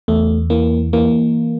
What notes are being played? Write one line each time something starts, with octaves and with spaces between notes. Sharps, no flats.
E2 A3
E3 A#3
E3 A#3